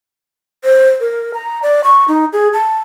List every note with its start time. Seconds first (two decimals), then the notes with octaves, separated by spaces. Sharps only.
0.64 C5
1.00 A#4
1.34 A#5
1.63 D5
1.84 C#6
2.08 D#4
2.33 G#4
2.53 A5